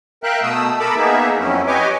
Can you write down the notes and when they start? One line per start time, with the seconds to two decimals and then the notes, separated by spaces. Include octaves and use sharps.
0.23 A#4 E5 F5 G5 F#6
0.43 B2 A3 D#6 E6
0.80 A4 A#4 B5 D6 E6
0.97 A#3 B3 D#4 G#4 E5
1.39 F2 F#3 C#4 E4
1.67 G4 B4 C#5 D#5 G#5 D6